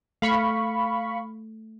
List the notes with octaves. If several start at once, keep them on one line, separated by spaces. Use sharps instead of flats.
A3 F5 B5 C#6